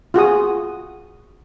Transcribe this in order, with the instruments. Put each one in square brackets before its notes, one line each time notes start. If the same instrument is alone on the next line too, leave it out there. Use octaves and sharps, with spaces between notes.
[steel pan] F4 F#4 G#4 D#6